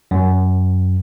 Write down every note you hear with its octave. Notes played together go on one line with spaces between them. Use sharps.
F#2